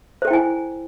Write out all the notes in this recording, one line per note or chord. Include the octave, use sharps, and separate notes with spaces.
E4 A4 C5 G5 G#5